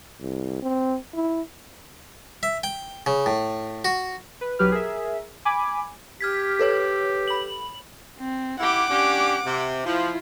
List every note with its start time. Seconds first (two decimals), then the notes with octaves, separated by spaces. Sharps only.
0.21 C2
0.63 C4
1.15 E4
2.43 E5
2.64 G5
3.06 C#3
3.26 A2
3.85 F#4
4.41 B4
4.59 B1 F#3 G4 B4 F6
4.71 G#4 A#4 E5
5.45 G#5 B5 D6
6.21 G4 F6 G#6 B6
6.59 A4 B4 C#5
7.28 B5 F#7
8.19 C4
8.60 E4 G4 F#5 D6
8.89 C#4 D4 G4
9.46 C3
9.86 F3 E4 F4